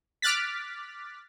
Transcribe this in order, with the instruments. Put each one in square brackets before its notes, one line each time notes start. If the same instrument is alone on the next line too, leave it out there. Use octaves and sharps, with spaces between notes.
[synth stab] D6 F6 F#6 A6 B6